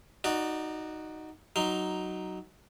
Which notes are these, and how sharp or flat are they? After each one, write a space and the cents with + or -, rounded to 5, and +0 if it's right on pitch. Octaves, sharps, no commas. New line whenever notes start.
D#4 +0 F#4 +0 D5 +20
F#3 +10 D#4 +0 C6 +0